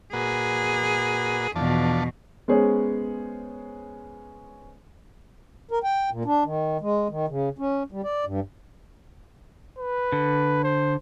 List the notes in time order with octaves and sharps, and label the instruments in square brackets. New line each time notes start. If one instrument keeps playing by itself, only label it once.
[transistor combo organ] A#2 F#4 B4 [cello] G#4
[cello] E2 B2 [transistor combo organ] F3 D4 A5
[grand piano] G#3 B3 C#4 G#4 C5 C#5
[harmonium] A#4
G5
A#2
D4
D#3
G#3
D#3
C#3
C#4
G3
D5
G2
[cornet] B4
[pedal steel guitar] D3
[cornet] C5